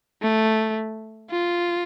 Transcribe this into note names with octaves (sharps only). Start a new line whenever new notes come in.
A3
F4